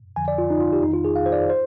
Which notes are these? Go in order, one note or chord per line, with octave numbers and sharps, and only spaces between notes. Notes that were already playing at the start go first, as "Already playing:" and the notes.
F2 D3 F3 G#5
D5
F4
D#4
F4
G4
F2 D#3 D#4
F4
G#4
F5
C5
D5
C5